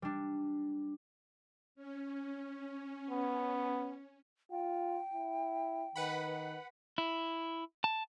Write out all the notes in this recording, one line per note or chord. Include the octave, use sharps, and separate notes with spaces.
G3 D4
C#4
B3
F4 G5
E4
D#3 B4 F#5 B5
E4
A5